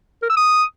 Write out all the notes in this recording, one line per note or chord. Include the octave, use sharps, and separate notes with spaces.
A#4
E6
D#6